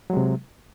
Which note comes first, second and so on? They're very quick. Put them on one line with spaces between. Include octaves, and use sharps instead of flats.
F#3 G#3 C3